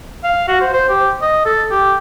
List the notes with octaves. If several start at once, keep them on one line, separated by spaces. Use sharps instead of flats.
F5
F#4
C5
C5
G4
D#5
A4
G4